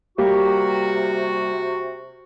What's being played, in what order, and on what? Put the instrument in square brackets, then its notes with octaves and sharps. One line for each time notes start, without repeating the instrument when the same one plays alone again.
[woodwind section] C3 F#4 [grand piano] G3 A#3 G4